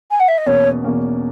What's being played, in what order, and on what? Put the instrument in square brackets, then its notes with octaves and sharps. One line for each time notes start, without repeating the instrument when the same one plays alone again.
[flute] G#5
F#5
E5
D#5
[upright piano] E2 B2 A#3 C#4 [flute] C#5
[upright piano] E2 B2 A#3 C#4